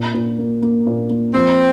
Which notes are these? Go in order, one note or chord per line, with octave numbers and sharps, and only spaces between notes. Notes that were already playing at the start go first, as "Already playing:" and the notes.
Already playing: A#2
A#2
A#3
A#3
A#2
A#3
F3 C4